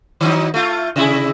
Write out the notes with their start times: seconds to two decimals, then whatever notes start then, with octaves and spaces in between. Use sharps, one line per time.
0.21 D#3 F#3 D#4
0.54 A3 F4
0.96 C3 E4 G#4